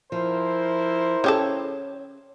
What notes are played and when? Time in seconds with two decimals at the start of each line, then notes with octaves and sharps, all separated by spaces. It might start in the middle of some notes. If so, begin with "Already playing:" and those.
0.12 F3 E4 A#4 C5
1.24 C#3 G4 A4 C#5